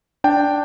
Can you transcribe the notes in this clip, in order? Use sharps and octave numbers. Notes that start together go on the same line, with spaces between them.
D4 G5